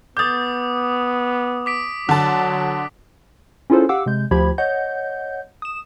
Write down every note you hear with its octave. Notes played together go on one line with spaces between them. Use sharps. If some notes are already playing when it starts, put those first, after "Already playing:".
B3 D6 D#6 G6 A6
D6 B6 D7
D3 F#3 A5
C#4 E4 F4 G#4 A4 C5
G4 F5 F#5 D6 E6
C3 G#3 G6
D2 F3 G4 B5 G#6
C#5 D#5 F#5 G6
D#6 E7